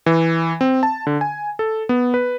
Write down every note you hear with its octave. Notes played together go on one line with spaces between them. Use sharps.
E3
C4
A5
D3
G#5
A4
B3
B4